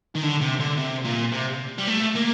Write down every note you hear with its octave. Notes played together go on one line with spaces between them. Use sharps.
D#3
D3
C3
D3
C3
A#2
C3
G3
A3
A#3